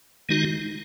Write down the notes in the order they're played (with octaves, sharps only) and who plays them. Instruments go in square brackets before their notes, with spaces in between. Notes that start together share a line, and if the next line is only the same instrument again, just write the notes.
[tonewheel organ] D#3 G#3 D#4 F#4